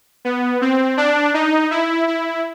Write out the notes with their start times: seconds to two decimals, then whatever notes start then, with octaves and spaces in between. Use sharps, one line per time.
0.25 B3
0.62 C4
0.97 D4
1.34 D#4
1.71 E4
2.07 E4